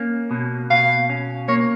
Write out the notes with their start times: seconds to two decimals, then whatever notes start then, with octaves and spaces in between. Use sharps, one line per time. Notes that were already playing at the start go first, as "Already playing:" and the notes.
Already playing: A#3 C#4
0.31 B2
0.70 B2 F5
1.10 C#4
1.48 A#3 C#5